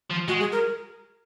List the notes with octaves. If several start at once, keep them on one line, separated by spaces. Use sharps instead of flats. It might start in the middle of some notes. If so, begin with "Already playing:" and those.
F3
G#3 F#4
G#4
A#4